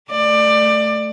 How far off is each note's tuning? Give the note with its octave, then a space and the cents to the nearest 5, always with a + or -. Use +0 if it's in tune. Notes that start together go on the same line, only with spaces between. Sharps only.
A3 +0 D5 +20